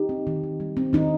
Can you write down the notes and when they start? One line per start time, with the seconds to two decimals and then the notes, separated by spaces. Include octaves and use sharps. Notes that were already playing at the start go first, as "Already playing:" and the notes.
Already playing: D#4 G4
0.09 C4
0.27 D#3
0.43 D#3
0.60 G3
0.77 C4
0.93 D#3 D#4